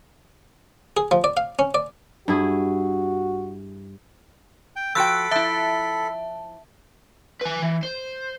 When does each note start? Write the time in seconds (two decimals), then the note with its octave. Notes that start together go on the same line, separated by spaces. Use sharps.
0.97 G#4
1.11 F3
1.24 D5
1.37 F5
1.59 C#4
1.74 D5
2.28 G2 E4 F#4 G#4
4.76 G5
4.95 F3 F#4 A4 G5 B5 E6 F#6 D7
5.31 F3 E4 E5 A5
7.42 B4 G#5
7.62 E3
7.83 C5